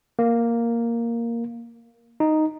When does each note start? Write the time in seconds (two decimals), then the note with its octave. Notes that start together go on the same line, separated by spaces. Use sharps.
0.19 A#3
2.20 D#4